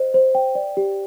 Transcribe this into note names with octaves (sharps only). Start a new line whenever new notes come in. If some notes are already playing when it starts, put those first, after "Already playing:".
Already playing: C5 D#5
C5
G5
D5
G4